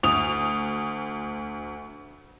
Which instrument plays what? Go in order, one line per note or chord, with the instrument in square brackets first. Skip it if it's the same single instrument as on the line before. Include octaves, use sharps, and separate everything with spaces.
[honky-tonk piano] D2 D#6 F7